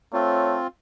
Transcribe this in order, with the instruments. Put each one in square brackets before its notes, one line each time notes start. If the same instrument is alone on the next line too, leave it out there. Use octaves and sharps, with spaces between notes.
[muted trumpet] A3 [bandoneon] C4 F4 [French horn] C#5